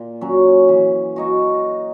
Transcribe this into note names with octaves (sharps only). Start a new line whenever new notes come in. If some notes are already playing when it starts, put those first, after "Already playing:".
Already playing: A#2
F#3 C#4
E3
A#3 D#4 F#4